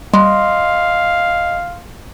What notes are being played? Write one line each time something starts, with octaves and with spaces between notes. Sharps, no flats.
G3 D#5 F5 C6